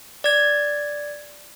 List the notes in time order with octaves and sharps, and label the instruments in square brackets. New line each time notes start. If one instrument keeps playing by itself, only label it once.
[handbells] D5 G#6